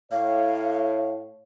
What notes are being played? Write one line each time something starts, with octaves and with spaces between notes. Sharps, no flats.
A2 C#5 F5